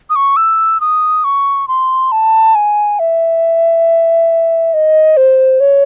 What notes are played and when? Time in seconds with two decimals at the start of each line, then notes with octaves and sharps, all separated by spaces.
0.10 D#6
0.16 C#6
0.37 E6
0.81 D#6
1.24 C#6
1.68 C6
2.12 A5
2.55 G#5
2.99 E5
4.74 D#5
5.17 C5
5.60 C#5